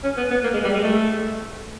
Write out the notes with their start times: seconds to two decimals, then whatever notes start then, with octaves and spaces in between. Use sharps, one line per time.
0.03 C#4
0.17 B3
0.31 B3
0.44 A#3
0.54 G#3
0.64 G3
0.74 G#3
0.84 A3